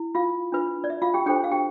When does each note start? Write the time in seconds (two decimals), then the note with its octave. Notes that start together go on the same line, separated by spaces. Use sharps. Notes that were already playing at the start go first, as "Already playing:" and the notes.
Already playing: E4
0.15 F4 F5
0.52 D4 F4 B4
0.84 D5
0.90 E5
1.02 F4 F5
1.14 G4 G5
1.26 D4 G4 A4 C5 G5
1.44 F5
1.51 G4 G5